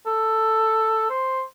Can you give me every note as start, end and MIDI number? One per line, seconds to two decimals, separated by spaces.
0.06 1.05 69
1.10 1.42 72